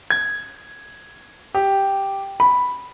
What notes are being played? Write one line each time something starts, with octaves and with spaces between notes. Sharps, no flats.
G#6
G4
B5